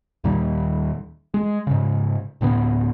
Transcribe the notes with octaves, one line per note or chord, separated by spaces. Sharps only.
D#2 A#2 D#3 G3
G#3
G#2 C#3
D1 A2 D3 B3